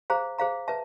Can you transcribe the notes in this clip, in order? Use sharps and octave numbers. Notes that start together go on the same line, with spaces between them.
G#4 C5 F5 A#5
G#4 C5 F5 A#5
B4 E5 A5